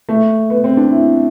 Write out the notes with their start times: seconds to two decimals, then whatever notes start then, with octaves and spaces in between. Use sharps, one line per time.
0.09 A3
0.50 B3
0.64 C4
0.77 D4
0.90 E4